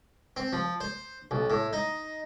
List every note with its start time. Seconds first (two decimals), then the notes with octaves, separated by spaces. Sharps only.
0.37 C4
0.53 F3
0.81 C5
1.31 B1
1.50 A2
1.73 D#4